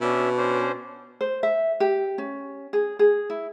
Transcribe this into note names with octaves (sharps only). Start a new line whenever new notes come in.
B2 C#4 D4 E5
C#4 D4 C5
C5
E5
G4
C#4
G#4
G#4
E4